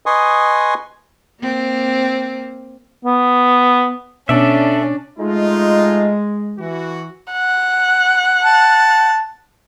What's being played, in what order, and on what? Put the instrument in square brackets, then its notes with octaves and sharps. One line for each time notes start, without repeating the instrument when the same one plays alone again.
[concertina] B4 D#5 G#5 C6 C#6 D#6
[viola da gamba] A#3 C4
[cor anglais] B3
[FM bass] B2 [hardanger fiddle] C#4 [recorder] D4 [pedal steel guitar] A4 D5 E5
[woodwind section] G#3 [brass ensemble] A3 D#4 F4
[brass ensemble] E3 F#4
[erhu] F#5
[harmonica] A5